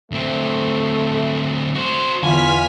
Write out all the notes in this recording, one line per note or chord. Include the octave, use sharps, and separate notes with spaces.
D2 A3 C4
F#4 C5
E2 D3 E3 F4 G#5 F6 B6